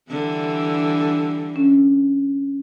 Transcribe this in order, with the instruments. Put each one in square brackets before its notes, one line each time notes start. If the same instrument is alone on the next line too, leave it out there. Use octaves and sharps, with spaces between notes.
[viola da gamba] D3 E3 G3
[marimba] C#4